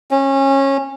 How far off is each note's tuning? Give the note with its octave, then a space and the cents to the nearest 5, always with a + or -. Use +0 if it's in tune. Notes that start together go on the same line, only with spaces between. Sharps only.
C#4 -25